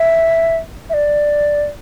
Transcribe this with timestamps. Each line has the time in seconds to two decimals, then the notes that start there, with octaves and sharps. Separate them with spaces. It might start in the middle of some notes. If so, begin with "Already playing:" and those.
Already playing: E5
0.90 E5
0.94 D5